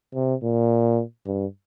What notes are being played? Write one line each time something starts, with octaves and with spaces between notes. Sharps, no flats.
C3
A#2
G2